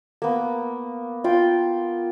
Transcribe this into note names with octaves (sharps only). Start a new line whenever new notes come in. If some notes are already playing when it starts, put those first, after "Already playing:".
A#3 B3
F4 G5